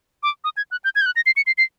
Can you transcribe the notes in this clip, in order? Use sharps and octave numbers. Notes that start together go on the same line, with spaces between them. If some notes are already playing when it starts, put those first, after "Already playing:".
D6
D#6
G#6
F#6
G6
G#6
G6
F#6
A#6
C7
C#7
C7
C7